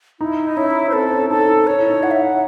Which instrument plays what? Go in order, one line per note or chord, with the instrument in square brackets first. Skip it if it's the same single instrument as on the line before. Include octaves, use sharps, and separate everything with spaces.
[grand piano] D#4 [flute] E4
[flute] D#4
[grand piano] C#4 [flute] E4
[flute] C5
[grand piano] C4 [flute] A4
[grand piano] C#4
[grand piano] D#4 [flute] A4
[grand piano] D#4
[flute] C#5
[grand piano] E4
D#4
[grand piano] E4 [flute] F#5
[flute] E5
F#5